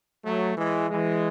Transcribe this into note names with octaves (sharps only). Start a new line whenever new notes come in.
F#3 A3
E3 G#3
E3 G#3